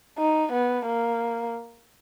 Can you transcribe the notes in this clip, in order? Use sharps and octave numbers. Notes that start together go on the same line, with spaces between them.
D#4
B3
A#3